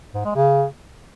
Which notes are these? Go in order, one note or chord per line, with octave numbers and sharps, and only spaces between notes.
G#2
G#3
C#3